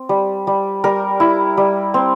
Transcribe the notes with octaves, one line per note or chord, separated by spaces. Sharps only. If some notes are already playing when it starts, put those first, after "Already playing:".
Already playing: C4
G3
G3
G3 A#4
E4
G3
C4